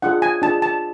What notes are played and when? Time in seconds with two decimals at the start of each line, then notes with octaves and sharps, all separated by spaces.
0.02 D4 F4 G#4 F#5
0.22 G#5
0.42 D4 F4 G#4 A5
0.62 A5